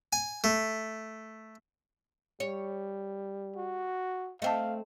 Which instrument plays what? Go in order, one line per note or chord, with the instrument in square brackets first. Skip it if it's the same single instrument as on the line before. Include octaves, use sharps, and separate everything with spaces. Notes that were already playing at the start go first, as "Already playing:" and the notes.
[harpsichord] G#5
A3
[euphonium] G3 [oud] C#5
[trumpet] F#4
[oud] A3 C4 [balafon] D#5 A5 [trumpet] F5